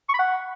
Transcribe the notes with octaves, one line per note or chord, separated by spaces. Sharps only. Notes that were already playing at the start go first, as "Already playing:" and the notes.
C#6
B5
F#5